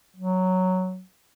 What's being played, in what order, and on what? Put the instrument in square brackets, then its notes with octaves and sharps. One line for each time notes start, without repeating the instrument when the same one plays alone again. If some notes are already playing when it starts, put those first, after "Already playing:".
[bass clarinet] F#3